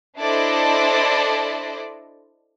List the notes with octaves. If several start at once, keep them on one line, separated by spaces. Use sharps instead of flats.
D4 E4 A4 C5 D5 D#5